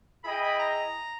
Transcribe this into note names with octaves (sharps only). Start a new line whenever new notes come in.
E4 G#4 D#5 G5 B5
B5
A#5